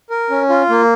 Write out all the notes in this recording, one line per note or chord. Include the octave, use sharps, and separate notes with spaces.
A#4
C#4
F4
A#3